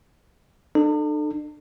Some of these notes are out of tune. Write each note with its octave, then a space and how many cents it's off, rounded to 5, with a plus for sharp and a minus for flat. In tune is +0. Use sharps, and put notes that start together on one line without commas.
D4 +45 A4 +0